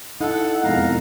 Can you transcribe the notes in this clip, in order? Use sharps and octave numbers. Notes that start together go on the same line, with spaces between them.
D#4 E4 A4 F#5
E1 F2 G#2 F5 A#5